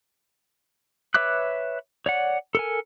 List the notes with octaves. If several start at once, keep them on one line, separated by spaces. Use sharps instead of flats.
B4 C#5 E5 D6 F#6
C#5 D5 F#5
A4 A#4 G#5